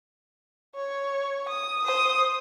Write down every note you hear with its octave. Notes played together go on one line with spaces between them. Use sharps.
C#5
D#6
C5 D#6